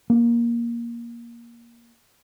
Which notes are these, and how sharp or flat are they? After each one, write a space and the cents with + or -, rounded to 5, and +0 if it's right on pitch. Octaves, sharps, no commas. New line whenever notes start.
A#3 +15